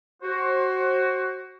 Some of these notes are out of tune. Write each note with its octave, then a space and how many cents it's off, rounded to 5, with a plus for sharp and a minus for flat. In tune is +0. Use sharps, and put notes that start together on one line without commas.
F#4 +15 C5 +30